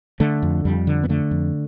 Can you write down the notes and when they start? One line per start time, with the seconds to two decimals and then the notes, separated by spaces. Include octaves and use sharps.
0.20 D3 A3
0.42 F2
0.65 F2 G3
0.87 D3
1.03 B3
1.09 D3 A3
1.31 F2